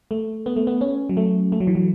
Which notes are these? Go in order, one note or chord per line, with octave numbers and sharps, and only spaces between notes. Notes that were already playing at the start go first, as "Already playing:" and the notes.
A3
B3
A3
B3
C#4
F#3
A3
A3
F#3
E3
F#3